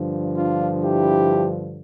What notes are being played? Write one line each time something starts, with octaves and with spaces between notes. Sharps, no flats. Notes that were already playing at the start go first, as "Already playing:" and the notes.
Already playing: G2 D3 F3
D4 F4
E4 G4